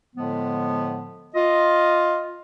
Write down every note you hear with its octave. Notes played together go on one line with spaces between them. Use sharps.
A2 D3 F3 G#3 B3
F4 D#5